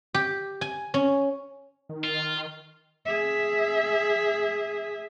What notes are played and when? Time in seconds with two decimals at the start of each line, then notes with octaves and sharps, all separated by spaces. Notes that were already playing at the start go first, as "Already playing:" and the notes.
0.14 G4
0.61 G#5
0.94 C#4
1.89 D#3
2.04 F4
3.06 G#4 E5